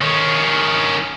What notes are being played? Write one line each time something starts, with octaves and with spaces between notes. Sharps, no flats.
D#3 C#4